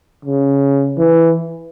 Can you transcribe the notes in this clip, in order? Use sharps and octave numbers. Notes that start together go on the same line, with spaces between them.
C#3
E3